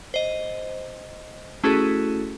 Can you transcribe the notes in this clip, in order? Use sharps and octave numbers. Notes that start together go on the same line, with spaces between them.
C5 D#5
A3 C#4 E4 F#4 G#4 A4